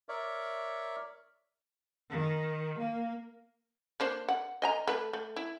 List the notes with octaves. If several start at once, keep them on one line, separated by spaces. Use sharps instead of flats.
A#4 C#5 D5 E5
D#3
A#3
A#3 D4 C5
F#5
D#5 G#5 A#5
A3 B4
A3
E4